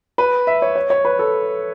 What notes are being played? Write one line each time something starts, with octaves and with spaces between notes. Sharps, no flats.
B4
E5
C#5
C#5
C#5
B4
A4